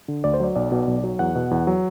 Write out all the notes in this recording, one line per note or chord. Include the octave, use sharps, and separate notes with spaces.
D3
D2 D5
C5
F#3 D5
B1 D5
B2
B1
F#3
E2 F#5
B2
E2
F#3